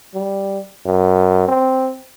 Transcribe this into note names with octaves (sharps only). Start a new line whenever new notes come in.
G3
F#2
C4